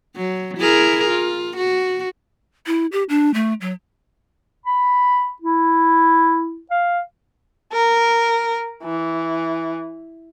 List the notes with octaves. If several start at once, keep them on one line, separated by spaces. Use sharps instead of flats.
F#3
E4 G#4 A#4
F4
F#4
E4
G4
D4
A3
F#3
B5
E4
F5
A#4
E3